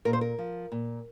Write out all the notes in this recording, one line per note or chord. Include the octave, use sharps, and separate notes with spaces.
A#2 A#4
C5
A#4
F3
A#2